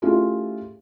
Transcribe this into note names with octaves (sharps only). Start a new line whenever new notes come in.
A3 C#4 E4 F4 G4 G#4